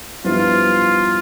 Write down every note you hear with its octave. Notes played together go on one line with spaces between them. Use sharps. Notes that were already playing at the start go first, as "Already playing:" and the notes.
G2 F3 B3 E4 F4